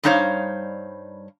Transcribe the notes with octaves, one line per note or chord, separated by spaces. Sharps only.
G2 G3 D#4 C5 C#5 F5